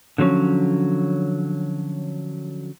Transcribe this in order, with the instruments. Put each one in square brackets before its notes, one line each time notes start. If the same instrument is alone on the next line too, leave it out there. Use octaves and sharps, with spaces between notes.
[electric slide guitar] D3 F3 F#3 C4 C#4